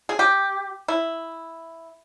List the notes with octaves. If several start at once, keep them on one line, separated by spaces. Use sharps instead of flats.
G#4
G4
E4